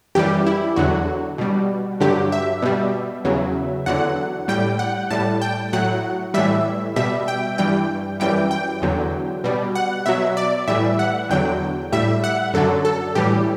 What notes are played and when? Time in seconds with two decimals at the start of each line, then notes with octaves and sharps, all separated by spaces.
0.15 F#2 E3 G3 G4
0.46 E4
0.76 E2 D3 F#3 F#4
1.38 B2 G3
2.00 G2 D3 F#3 G4
2.32 E5
2.62 B2 G3
3.25 E2 C#3 F#3
3.86 E2 D3 F#3 F#5
4.48 A2 G3 G5
4.79 F#5
5.11 A2 G3 A5
5.42 G5
5.73 A2 F#3 F#5
6.34 A2 E3 G3 E5
6.96 B2 G3 E5
7.28 G5
7.58 G2 E3 G3 G5
8.20 F#2 E3 G3 G5
8.51 G5
8.82 E2 D3 F#3
9.44 B2 G3
9.75 F#5
10.06 B2 F#3 E5
10.37 D5
10.68 A2 E3 G3 E5
10.99 F#5
11.30 E2 D3 F#3 G5
11.92 A2 G3 E5
12.24 F#5
12.54 F#2 D3 F#3 A4
12.85 A4
13.15 A2 E3 G3 G4